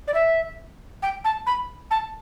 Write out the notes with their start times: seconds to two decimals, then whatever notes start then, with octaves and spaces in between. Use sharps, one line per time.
0.08 D5
0.14 E5
1.02 G5
1.24 A5
1.46 B5
1.91 A5